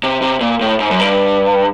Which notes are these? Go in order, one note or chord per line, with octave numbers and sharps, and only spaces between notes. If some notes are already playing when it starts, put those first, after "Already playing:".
C3
C3
A#2
A2
G#2
F#2
G2